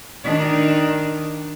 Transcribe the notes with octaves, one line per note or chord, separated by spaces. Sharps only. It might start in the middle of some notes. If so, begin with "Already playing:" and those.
D#3 D4 D#4